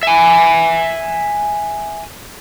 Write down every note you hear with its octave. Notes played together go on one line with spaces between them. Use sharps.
E5 G#5